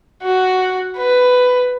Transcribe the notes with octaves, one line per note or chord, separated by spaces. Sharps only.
F#4
B4